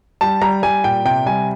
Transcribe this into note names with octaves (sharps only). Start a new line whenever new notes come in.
G3 A5
G3 A#5
G3 G#5
A#2 G5
C3 G5
G3 G#5